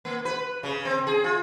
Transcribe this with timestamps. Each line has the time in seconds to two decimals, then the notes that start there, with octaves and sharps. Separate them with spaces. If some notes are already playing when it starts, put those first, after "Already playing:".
0.05 A#3
0.25 B4
0.63 C#3
0.85 C4
1.07 G#4
1.24 F4